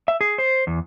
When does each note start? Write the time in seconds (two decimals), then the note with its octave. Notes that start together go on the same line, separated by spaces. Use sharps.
0.08 E5
0.21 G#4
0.38 C5
0.67 E2